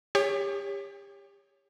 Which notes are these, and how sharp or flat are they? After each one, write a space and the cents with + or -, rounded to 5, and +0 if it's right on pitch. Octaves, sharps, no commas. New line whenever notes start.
G4 +30 C#5 +0